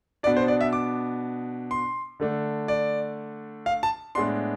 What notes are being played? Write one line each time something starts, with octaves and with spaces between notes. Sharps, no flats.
B2 B3 D4 D5
C5
D5
E5
D6
C6
D3 A3 D4
D5
F5
A5
A2 G#3 B3 D4 C6